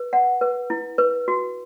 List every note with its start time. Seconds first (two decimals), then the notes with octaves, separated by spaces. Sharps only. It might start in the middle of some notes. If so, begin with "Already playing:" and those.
Already playing: B4
0.13 F#5
0.41 B4
0.70 E4
0.98 B4
1.28 F#4